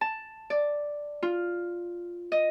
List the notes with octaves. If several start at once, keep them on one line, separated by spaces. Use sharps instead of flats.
A5
D5
F4
D#5